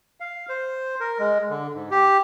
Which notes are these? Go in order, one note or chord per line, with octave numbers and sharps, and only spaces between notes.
F5
C5
A#4
G#3
D3
G#2
G4